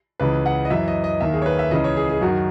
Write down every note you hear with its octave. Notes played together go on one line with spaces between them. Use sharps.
C#2 C#3 E3 B4
F#5
D#5
F#2 E3 E5
D#5
D#5
D#2 D#3 E5
G#4
C#5
B4
E5
C#2 C#3 E3 D#5
C#5
G#4
G#4
F#2 D#3 F#4